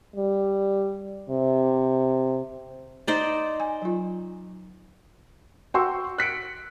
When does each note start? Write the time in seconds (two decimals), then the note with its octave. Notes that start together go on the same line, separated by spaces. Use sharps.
0.16 G3
1.30 C3
3.07 D#4 C5 D5
3.60 G#5
3.82 F#3 F4
5.74 F#4 F#5 G5 C6 C#6 E6
6.18 F#6 B6 C#7 D7